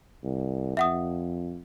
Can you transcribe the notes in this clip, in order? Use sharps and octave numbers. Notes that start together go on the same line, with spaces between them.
C2
F2 E5 F#5 D#6